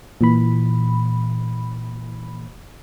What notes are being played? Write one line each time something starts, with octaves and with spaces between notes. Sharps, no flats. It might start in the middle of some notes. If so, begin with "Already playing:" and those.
A#2 E3 B5